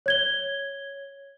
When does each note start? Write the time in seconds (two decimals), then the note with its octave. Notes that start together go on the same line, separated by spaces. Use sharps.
0.06 C#5 G#6 G7